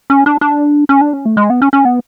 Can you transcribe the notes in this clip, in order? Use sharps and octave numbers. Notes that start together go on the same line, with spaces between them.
C#4
D4
D4
C#4
D4
C#4
A3
G#3
B3
C#4
C#4
B3